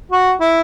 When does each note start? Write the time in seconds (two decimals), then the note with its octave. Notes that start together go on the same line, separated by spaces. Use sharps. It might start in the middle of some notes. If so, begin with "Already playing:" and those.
0.11 F#4
0.40 E4